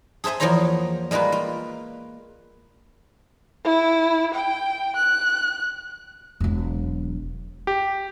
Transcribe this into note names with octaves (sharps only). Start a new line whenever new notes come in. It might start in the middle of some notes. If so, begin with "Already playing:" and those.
G#4 A4 C5 E5 G#5
E2 F3 A#3 C5 C#5 A#5
G3 G#3 A#3 F4 B4
F4
E4
G5
F#6
E1 F#3
G4